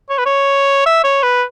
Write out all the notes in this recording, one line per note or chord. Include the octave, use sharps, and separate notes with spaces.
C#5
B4
C#5
E5
C#5
B4